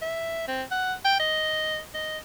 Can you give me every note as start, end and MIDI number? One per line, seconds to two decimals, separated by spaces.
0.02 0.48 76
0.48 0.63 60
0.71 0.93 78
1.05 1.17 79
1.20 1.79 75
1.94 2.18 75